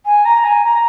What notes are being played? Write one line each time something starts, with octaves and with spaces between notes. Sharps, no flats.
G#5
A#5
G#5
A#5